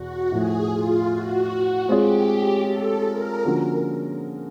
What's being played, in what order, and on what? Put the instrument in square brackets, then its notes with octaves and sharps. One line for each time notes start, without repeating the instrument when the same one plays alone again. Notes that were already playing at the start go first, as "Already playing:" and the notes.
Already playing: [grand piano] E2 B2 [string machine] F#4
[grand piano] A2 F3 A3 [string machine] G#4
[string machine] F4
F#4
[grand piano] G#3 C4 F4 G#4 C#5 [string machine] G4
[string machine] A4
A#4
[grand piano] D3 F3 A#3 C#4 F#4